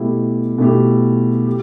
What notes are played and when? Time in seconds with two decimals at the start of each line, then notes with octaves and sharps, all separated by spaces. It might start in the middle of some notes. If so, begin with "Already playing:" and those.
Already playing: B2 A3 E4 G4
0.58 B2 A3 E4 G4
1.47 G4